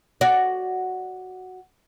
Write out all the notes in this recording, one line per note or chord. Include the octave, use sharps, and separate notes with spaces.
F#4 D5